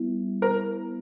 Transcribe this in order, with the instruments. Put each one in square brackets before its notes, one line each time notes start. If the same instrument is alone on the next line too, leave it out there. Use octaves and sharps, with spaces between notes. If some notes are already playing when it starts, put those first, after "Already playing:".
Already playing: [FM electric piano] G3 B3 E4
[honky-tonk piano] A#4